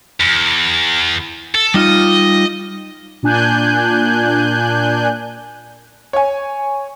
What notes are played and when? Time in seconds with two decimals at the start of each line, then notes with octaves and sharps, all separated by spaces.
0.20 E2
1.55 A4
1.74 G3 D#4 F4 D#5
3.23 A#2 D4 G#5 F#6 G6
6.13 C#5 G#5